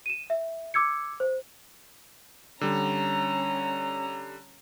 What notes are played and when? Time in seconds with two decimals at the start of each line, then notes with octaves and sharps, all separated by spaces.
0.06 D#7 E7
0.30 E5
0.74 D6 E6 G#6 C#7
1.20 C5
2.61 D3 G3 C#4 A#5